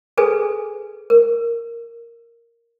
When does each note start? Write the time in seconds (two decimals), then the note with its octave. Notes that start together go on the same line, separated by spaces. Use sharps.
0.17 G#4 A4 B4 G#5
1.10 A#4